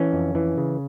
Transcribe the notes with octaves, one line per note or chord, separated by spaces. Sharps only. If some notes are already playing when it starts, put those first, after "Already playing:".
Already playing: E3 C#4
F2
E3
C#3